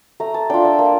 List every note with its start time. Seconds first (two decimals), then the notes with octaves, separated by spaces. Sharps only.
0.20 A3 A#5
0.34 A5
0.50 D4 F4 G5
0.65 E5
0.79 A#3